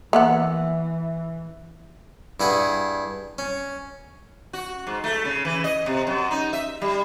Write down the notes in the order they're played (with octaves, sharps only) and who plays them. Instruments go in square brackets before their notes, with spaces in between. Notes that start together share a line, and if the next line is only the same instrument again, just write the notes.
[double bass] E3 [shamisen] A#3 B3 F#5 [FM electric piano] E5
[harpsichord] G2 E4 G#4 F#5
C#4
[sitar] F#4
G#2
A3
C#3
E3
D#5
C3
F#2
D#4
E5
G3